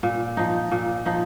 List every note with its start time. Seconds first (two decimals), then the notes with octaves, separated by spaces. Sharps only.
0.03 A#2
0.37 F3 D#4
0.71 A#2
1.06 F3 D#4